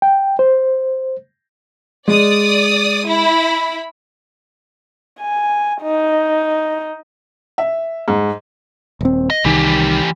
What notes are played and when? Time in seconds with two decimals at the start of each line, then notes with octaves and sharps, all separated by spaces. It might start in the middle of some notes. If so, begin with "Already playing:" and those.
0.02 G5
0.39 C5
2.08 G#3 D5 D#6
3.07 E4 B5
5.21 G#5
5.83 D#4
7.58 E5
8.08 G#2
9.01 D#1 C4
9.30 D#5
9.45 C2 D#3 E3 G4